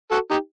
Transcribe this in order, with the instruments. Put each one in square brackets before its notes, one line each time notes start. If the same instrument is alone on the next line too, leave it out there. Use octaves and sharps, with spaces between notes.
[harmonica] F#4 A4
D#4 G4